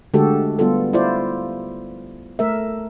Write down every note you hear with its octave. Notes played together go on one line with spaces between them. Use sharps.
D3 G#3 A3 F#4 G4 A4
G3 B3 F4 A4
E4 F4 C5 D5
A3 A#4 E5